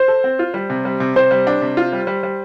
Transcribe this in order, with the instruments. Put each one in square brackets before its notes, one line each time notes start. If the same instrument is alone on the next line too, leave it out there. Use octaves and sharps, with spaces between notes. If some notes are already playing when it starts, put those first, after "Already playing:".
Already playing: [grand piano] C5
[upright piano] A4
C4
F4
G3
C3
G3
C3
[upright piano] C3 [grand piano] C5
[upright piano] G3
D4
C3
F4
G3
G3
G3